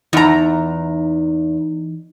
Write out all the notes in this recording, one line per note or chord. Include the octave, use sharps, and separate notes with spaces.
E2 E3 D#4 A#5